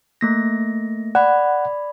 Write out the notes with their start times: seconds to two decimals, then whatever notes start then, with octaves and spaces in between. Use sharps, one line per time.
0.21 A3 A#3 A#6
1.15 D5 F#5 B5